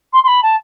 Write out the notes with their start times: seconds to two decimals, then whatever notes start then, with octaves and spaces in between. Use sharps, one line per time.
0.12 C6
0.23 C6
0.27 B5
0.42 A5